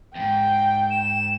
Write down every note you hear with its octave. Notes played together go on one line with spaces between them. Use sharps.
E2 G#2 G5
E7